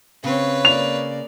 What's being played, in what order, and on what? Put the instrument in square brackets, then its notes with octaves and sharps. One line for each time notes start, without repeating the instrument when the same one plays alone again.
[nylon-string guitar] C#3 [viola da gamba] C4 [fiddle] B4 C#5
[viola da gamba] A#3 D5 [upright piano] F7